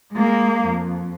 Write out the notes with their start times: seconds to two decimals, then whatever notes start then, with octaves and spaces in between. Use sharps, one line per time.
0.13 G#3 A#3
0.65 F2